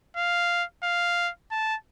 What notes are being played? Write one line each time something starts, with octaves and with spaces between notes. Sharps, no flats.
F5
F5
A5